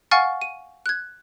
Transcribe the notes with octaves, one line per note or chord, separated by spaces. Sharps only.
F5 F#5 G#5 C#6 F6 A6
D#7
F#6 G#6